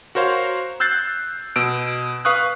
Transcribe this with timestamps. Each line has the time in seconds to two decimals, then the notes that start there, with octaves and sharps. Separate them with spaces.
0.15 F#4 A#4 C5 C#5 F5
0.80 E6 F#6 G6 A6 C7
1.56 B2 E6 D7
2.25 B4 F5 C#6 D#6 F#6